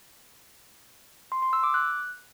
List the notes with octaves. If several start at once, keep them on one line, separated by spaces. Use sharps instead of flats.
C6
C6
E6
D6
F#6